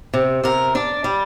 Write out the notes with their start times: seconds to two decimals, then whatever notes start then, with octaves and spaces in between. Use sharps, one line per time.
0.14 C3
0.44 C3 A#4
0.75 D4 D5
1.04 G3